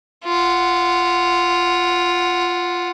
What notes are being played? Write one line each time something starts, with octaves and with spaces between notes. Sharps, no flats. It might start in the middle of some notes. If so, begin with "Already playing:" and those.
F4 F#5